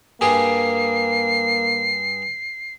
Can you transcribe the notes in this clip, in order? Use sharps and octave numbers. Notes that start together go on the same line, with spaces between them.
G2 G3 A#3 G#4 C7